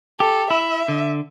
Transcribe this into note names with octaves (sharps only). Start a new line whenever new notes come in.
G4 A4
E4 E5
D3